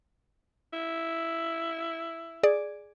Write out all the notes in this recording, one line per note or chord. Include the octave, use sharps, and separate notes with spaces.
E4
G#4 D5